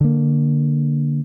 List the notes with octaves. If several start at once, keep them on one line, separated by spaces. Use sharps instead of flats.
D3 A#3